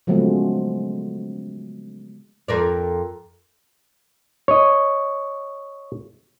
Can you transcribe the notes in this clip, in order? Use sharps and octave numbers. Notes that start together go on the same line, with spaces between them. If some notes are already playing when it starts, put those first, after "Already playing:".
C#3 F3 F#3 G#3 A3 B3
F2 A#4 D5
C#5 D#5